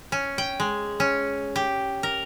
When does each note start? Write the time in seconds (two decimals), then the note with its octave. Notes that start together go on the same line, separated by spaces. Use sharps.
0.12 C#4
0.38 G5
0.60 G#3
1.00 C#4
1.56 G4
2.03 A#4